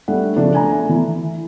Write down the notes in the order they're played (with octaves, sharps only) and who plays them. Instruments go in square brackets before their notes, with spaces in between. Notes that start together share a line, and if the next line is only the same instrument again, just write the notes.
[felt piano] G3 A3 D4 F#5
C#3 F3 A3 D4
G#5 A#5
A3
E3